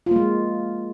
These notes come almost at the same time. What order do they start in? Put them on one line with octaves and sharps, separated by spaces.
F4 A#3 G#3